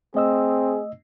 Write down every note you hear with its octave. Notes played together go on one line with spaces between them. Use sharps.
A3 C4 G#4 D#5 E6